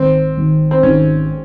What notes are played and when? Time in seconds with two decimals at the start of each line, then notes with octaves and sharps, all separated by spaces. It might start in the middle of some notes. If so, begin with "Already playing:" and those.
Already playing: G#1 C4
0.37 G#1
0.71 C4
0.83 G#1 C#4